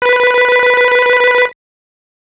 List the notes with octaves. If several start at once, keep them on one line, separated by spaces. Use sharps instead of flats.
B4 B6